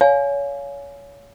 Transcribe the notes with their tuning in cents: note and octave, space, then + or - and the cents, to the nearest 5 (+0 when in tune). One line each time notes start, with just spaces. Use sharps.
C#5 +25 F5 +0 G#5 +15